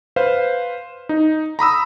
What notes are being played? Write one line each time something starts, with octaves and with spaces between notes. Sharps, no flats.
B4 C5 F5
D#4
A#5 B5 D#6 E6